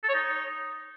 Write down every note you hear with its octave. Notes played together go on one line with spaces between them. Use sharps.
A4
C#5
D#4